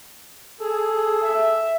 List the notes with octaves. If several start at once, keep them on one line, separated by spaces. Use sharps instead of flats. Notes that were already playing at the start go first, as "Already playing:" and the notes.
G#4 A4
E5